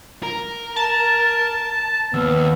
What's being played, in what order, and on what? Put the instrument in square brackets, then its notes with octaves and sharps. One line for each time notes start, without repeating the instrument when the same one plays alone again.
[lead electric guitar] A#4
[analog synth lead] A5 [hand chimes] A#5
[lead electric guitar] D#2 [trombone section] B3 [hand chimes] E6 F6